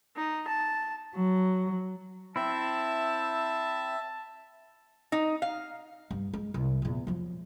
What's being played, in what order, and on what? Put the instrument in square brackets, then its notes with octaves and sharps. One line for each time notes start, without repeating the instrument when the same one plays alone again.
[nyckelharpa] D#4
A5
[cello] F#3
[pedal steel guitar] C4 E4 [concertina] E5 [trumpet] A5
[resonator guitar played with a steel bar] D#4
F5
[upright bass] G2
G#3
C2
E2 A#2
F3 F#3